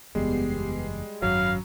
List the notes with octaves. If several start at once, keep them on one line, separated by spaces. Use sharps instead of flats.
F#1 E2 G3 G#3 B3 G4 C7
G#1 F#2 F#3 F5 B5 F6